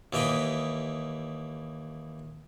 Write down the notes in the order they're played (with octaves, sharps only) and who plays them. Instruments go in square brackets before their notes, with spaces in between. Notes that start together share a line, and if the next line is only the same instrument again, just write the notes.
[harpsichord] D#2 E3 G4 D#5 B5